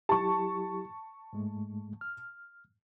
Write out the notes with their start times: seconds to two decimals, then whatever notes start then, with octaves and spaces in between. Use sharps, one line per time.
0.09 F#3 E4 G4 A5 C#6
1.33 G#2 G#3 A3
2.01 F6